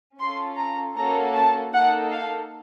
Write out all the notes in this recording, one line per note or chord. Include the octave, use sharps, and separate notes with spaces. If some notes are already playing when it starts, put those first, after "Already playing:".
C#4 F4 A4 C6
A#5
A#3 C#4 F#4 A4 A#5
A5
A#3 D#4 A4 F#5
F5